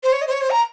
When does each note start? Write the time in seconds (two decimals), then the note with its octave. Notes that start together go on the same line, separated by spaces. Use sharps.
0.03 C5
0.12 C#5
0.22 D#5
0.27 C5
0.32 C#5
0.41 C5
0.50 A#5